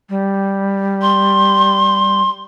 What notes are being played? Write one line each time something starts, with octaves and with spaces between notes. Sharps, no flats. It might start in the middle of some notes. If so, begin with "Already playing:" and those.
G3
C6